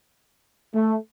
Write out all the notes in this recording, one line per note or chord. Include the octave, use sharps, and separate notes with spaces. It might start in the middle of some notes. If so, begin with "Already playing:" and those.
A3